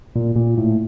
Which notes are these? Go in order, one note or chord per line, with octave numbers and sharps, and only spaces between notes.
A#2
A#2
A2